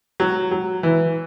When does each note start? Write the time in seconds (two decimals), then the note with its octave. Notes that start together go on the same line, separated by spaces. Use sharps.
0.20 F#3
0.51 F#3
0.83 E3